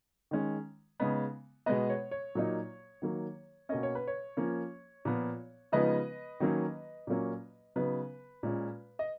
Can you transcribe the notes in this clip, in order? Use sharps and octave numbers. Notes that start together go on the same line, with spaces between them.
D#3 G#3 C#4
C#3 G#3 B3 D#4
B2 G#3 B3 B4 D#5
C#5
C#5
A#2 F#3 A#3 D#4
D#3 F#3 A#3
B2 A#3 C#4 D#5
C#5
B4
C#5
F3 A#3 C#4
A#2 F3 B3
C#3 F3 G#3 B3 D#4 B4 D#5
D#3 F#3 A#3 C#4
A#2 F#3 A#3 C#4
C#3 F#3 B3 D#4 B4
A#2 G#3 C#4
D#5